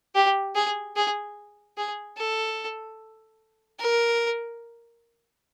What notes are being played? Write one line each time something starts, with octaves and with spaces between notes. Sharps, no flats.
G4
G#4
G#4
G#4
A4
A#4